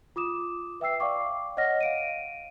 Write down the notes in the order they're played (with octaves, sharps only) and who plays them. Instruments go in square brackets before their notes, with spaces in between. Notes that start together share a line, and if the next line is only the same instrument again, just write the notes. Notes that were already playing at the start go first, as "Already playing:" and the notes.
[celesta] F4 D6 D#6 E7
B4 E5 G5 E6 C7
D5 F5 G5 C#6 D6
C#5 D#5 F#5 F6 A#6
F5 D7 D#7